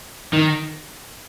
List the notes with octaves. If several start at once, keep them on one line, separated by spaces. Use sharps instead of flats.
D#3